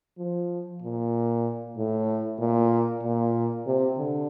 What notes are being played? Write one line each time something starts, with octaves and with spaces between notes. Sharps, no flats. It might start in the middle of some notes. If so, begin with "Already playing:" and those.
F3
A#2
A2
A#2
A#2
C3
D3